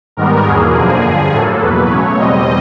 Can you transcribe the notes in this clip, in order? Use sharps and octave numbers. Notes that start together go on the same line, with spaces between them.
G#2 D#3 G3 B3 A#4
E2 B2 F#3 A#3 G#4
F#2 D3 F3 A#3
G2 D3 F3
A2 F#3 A#3 A4
E2 B2 F#3 A#3 B4
C#3 F#3 A3 C#5
E2 B2 G3 C4 D#5